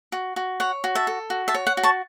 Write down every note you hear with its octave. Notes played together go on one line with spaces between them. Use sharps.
F#4
F#4
C#5 F#5
F#4
E5 A5
A4
F#4
E5 A5
C#5
F#5
F#4
A5 C#6